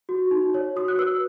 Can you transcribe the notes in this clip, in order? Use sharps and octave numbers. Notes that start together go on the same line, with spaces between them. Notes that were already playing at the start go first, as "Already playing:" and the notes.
F#4
D#4
C#5
F#4 D#6
F#6
B4 E6